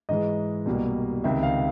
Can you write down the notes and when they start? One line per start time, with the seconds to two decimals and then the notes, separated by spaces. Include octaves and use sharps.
0.09 G#2 E3 G#3 D#5
0.66 C2 B2 G3 A#3
1.24 C#2 C3 D#3 E5
1.43 F5